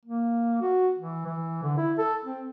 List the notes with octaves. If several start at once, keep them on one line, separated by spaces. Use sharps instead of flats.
A#3
F#4
E3
E3
D3
E4
A4
C4